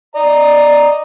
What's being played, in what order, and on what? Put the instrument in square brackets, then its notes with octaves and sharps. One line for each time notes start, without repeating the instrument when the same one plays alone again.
[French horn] D5 [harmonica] D#5 A#5